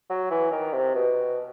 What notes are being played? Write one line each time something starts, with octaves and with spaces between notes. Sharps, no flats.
F#3
E3
D#3
C3
B2